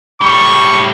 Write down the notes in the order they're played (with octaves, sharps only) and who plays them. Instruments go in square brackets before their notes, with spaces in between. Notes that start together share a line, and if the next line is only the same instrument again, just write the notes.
[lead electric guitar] A2 G3 [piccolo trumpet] C#6